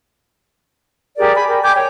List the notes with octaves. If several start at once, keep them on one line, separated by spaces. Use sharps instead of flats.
G4 G#4 A#4 D5
G#5 B5
A#4 G5
G5 G#5 D6 G6
C#5 G5